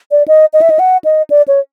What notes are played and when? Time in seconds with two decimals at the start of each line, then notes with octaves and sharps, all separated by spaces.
0.11 D5
0.28 D#5
0.53 D#5
0.62 E5
0.70 D#5
0.79 F#5
1.04 D#5
1.30 D5
1.48 C#5